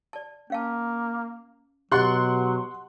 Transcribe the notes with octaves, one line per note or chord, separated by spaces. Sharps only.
D5 A5
A#3 C#4 F5 A5
B2 F#3 G4 D#5 F#5 C6 F#6